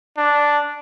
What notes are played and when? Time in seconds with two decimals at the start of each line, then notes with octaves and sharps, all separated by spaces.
0.17 D4